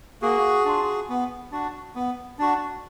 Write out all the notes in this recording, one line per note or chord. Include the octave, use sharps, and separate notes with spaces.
A#3 F#4 G#4
D4 F4
B3
D4 F#4
B3
D4 F#4